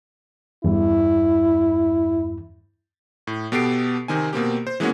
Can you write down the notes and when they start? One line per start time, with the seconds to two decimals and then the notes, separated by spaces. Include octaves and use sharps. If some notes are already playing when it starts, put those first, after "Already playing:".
0.64 E2 G2 E4
3.27 A2
3.52 B2 B3 G4 A4 C7 D7
4.08 C3 D#3 C4 G#5
4.33 B2 A#3 C4 G4
4.67 C5
4.80 E3 G#3 A#3 B3 C#4 F#4